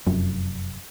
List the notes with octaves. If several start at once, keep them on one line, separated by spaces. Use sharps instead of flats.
F1 F#2